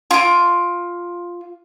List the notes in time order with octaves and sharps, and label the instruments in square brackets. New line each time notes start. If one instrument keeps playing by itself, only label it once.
[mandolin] F4 D6